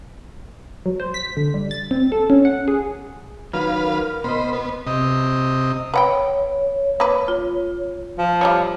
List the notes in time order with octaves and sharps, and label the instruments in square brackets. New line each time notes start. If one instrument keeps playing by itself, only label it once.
[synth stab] F#3
C5
B6
D3
G3
A6
C4
A4
C#4
F#5
G#4
[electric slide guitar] D#3 F#3 [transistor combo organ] B4 F5
[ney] A#4
[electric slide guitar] B2 D#5 [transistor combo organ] C5 B5
[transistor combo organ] B3
C3 D#5
[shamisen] B4 F#5 G5 [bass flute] C#5 [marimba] B5
[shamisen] A#3 B4
[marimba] F4
[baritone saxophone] F3
[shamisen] G3 F4 C#5